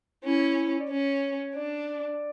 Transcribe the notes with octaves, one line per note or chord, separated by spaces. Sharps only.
C#4 E4
D5
C#4 C#5
D4 D5